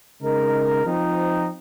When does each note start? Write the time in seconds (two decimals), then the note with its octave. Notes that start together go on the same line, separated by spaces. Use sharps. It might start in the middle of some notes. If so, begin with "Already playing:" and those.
0.20 C#3 G#3 D#4 A#4
0.85 F3 C4 D#4